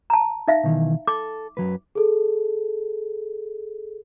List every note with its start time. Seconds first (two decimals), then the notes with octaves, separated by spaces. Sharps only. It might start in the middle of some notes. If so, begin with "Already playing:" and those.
0.10 A5 A#5
0.48 D#4 E5 F5
0.64 B2 D#3 E3
1.07 A4 D6
1.57 F#2 F#3 B4
1.95 G#4 A4